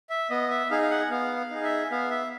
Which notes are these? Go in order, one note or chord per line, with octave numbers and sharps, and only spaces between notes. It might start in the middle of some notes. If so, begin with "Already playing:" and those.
E5
B3 D#5
E5
D#4 G#4 F5
F5
F#5
B3 F5
F5
D#4 G#4
E5
B3 F5
E5